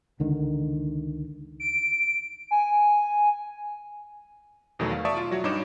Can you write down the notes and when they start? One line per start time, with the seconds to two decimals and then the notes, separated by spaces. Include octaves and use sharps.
0.20 C#2 D3 D#3
1.60 D7
2.51 G#5
4.79 E2 B2 D#3 F#3 A3 B3
4.92 F5
5.05 D5 E5 A5 C#6 D#6
5.17 F4
5.31 F#3 F#4 C#5
5.44 G2 D#4 C#5 D6 E7